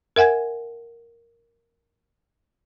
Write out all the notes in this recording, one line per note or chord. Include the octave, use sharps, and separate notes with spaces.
A#4 E5 F#5 G#5 G#6